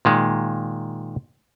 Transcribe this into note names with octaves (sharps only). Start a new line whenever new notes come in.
A#2 D#3 G#3